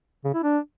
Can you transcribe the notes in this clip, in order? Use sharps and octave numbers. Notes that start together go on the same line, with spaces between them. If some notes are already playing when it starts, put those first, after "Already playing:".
C#3
E4
D4